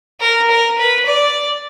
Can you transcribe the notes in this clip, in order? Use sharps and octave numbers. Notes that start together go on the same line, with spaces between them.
A#4
A#4
B4
D5